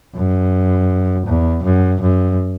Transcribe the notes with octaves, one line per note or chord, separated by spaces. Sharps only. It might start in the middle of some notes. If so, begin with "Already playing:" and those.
F#2
E2
F#2
F#2